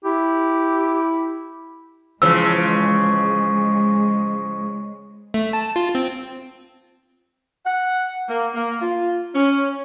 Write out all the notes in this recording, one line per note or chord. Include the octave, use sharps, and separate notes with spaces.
E4 G4
C#3 E3 F3 G#3 E6
A3
A5
F4
C4
F#5
A#3
A#3
F4
C#4